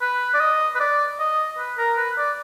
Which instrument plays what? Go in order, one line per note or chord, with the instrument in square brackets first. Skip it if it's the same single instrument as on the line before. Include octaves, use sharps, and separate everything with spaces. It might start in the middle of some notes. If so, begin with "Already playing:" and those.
[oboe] B4
D5
D#5
B4
D5
D#5
B4
A#4
B4
D5